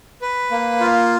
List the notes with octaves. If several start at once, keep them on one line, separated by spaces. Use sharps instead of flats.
B4
A#3
F4